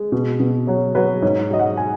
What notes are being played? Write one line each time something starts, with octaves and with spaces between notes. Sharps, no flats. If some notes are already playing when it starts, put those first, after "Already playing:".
Already playing: G#3
B2
B2
F#3 C#5
F#3 B4
G#2 C#5
F#3 D#5
F#5
G#5